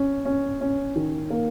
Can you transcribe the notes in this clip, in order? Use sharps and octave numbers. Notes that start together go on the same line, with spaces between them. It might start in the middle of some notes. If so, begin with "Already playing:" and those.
Already playing: C#4
C#4
C#4
D#3
A#3